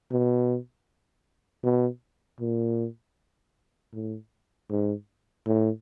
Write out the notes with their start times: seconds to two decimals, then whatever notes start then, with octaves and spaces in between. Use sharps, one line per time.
0.11 B2
1.64 B2
2.40 A#2
3.93 A2
4.70 G#2
5.47 A2